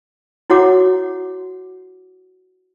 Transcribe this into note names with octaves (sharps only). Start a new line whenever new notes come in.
E4 F#4 C#5 F#5 D6